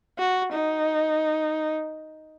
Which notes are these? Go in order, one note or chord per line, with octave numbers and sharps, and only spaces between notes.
F#4
D#4